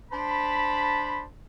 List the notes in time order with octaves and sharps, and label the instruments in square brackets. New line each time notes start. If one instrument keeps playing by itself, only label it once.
[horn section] D4 C5 A5 B5